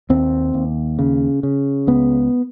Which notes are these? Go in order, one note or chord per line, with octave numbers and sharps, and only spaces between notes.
D#2 C4
D#2
C#3
C#3
C#2 B3